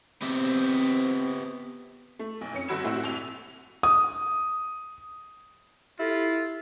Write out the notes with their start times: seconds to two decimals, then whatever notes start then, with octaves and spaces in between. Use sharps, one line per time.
0.22 B3 C4 G4 E5
2.19 A3
2.41 B1
2.53 F2 C#4 C#7
2.68 G1 F#4 B5 E6 G#6 E7
2.84 A2 C4 E4 F#4 G4 E6
3.04 C2 F7
3.83 D#6
5.99 E4 F4 G4 A4 A#6